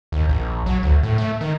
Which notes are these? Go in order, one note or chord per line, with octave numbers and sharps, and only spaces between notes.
D#2
A#1
F#3
D2
A2
A3
D#3